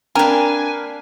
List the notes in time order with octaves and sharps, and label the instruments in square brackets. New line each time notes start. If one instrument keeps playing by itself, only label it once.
[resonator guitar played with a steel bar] A#3 D4 [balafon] C4 G5 [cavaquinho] A#4 B4 [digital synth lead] G#5